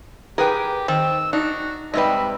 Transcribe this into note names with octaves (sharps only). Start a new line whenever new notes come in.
G4 G#4 A#4 B4 G5
D#3 C4 E6
D4 D#4 F#4
G#2 C3 G3 B4 D#5 E5